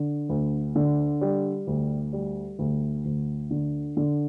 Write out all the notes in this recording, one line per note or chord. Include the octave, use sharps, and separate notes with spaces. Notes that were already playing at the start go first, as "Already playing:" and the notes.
Already playing: D3
D2
D3
G3
D2
G3
D2
D2
D3
D3